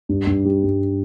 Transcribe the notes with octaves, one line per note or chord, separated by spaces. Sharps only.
G2
G2
G3
G2